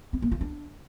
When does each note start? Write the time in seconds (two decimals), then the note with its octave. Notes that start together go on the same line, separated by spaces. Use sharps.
0.13 C4
0.22 A#3
0.32 F4
0.41 D4